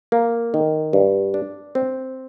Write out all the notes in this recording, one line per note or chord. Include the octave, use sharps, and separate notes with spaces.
A#3
D#3
G2
D4
C4